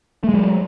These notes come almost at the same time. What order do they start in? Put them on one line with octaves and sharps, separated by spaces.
A3 G#3 F#3